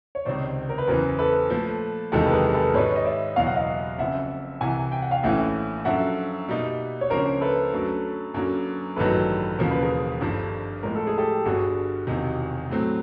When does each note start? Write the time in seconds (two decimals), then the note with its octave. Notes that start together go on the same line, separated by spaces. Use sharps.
0.15 C#5
0.25 C#2 C3 D#3 C5 D5
0.69 A#4
0.78 B4
0.87 F#1 E2 C#3 E3 A#4 C5
1.19 A4 B4
1.50 A#2 F3 A3
2.12 F#1 E2 C3 D#3 G#3 G4 A4
2.26 B4
2.33 G#4 A#4
2.54 A4 B4
2.74 G#2 D#3 G3 B4 C#5
2.96 D#5
3.05 D5 E5
3.36 F#1 E2 B2 F#3 F5
3.47 F#5
3.55 D#5 F5
3.98 F#1 F2 C#3 E5 F#5
4.61 C2 C3 E3 F#5 G#5
4.92 G5
5.02 F#5
5.11 F5 G5
5.23 A#1 A2 E3 A3 C#4 E5 F#5
5.85 F#2 D3 F3 E5 F#5
6.48 B2 G3 A#3 D#4
7.01 C#5
7.10 C#2 C#3 F3 A#3 D4 A#4 C5
7.41 A4 B4
7.72 F#2 D3 F#3 A3
8.34 F#2 D3 F#3 A#3
8.96 A1 G2 D#3 F#3 A4 B4
9.58 E1 D#2 C#3 F3 A#4
9.71 B4
9.82 G#4 A#4
10.21 G#1 G2 D3 F3
10.83 A2 F3 G#3 A#4
10.95 A4
11.07 G#4
11.18 G4 A4
11.45 G1 G2 D3 F#4 G#4
12.07 E1 E2 C3 D#3
12.69 A2 F#3 A3 C4